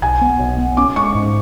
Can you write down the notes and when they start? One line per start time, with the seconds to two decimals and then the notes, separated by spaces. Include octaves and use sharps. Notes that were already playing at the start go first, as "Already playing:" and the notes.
0.02 B1 G#5
0.21 B3
0.39 B1
0.58 B3
0.77 C#4 D6
0.96 G#3 C#6
1.15 G#2